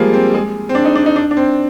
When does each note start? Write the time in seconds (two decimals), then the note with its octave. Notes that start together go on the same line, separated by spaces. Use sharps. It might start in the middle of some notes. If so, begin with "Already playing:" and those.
Already playing: F3 G3 G#3 A#3
0.14 C4
0.34 G#3
0.69 C4
0.75 D4
0.85 D#4
0.96 D4
1.06 D#4
1.16 D4
1.31 D4
1.37 C4